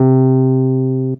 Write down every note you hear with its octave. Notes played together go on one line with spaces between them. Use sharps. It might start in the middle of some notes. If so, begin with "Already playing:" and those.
Already playing: C3